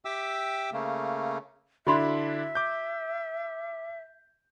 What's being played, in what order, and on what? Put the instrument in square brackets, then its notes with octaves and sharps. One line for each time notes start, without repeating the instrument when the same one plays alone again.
[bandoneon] G4 E5 G5 D6 E6
C#3 A3 A#3
[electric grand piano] D3 D4 E4 [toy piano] F#4 B5 C6 [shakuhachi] E5
[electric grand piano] D6 G6